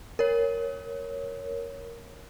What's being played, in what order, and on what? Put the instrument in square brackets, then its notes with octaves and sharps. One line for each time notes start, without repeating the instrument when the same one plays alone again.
[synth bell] A#4 C#5